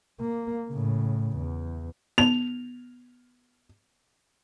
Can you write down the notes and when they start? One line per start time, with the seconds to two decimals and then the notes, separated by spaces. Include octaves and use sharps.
0.20 A#3
0.70 A2 C#3
1.38 E2
2.18 B3 F7